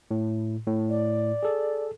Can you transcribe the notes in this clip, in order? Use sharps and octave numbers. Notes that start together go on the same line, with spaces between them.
A2
A2
D5
G#4 A4